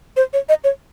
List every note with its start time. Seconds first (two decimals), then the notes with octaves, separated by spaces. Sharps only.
0.17 C5
0.33 C#5
0.49 D#5
0.64 C#5